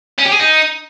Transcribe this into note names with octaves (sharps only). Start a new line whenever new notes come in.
C#4
G4
G#4
D#4